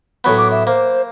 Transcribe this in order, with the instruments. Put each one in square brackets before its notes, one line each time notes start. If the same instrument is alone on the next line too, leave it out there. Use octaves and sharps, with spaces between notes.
[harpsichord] A2 F#3 B3
[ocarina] D6
E5
[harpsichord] A#3 [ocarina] C5